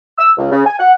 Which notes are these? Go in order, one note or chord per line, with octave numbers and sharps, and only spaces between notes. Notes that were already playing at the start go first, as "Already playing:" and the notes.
E6
C#2
C#3
G#5
F#5